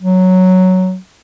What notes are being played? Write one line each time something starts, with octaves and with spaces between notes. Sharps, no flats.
F#3